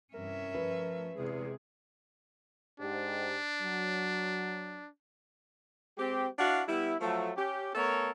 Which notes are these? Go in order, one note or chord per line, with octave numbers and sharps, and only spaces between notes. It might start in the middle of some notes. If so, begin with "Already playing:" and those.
G2 C3 E3 C#4 A#4 E5
F3 A3 B4
E2 C3 G#3 G#4
G#2 D4 G4
F#3
G#3 C4 G4
D4 E4 F#4 F5 F#5
G3 B3 E4
F3 F#3 A3
C#4 G4
A3 B3 A4 A#4 C#5